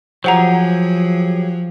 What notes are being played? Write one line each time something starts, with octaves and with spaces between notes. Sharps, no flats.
F3 F#3 G4 G#4 C5 F#5 A#5